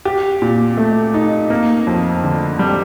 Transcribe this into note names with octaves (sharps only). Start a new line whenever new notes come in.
G4
A#2
A3
D#4
A#3
F2
D3
G3